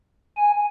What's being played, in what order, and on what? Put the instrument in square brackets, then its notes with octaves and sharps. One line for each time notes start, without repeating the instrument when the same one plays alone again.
[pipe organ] G#5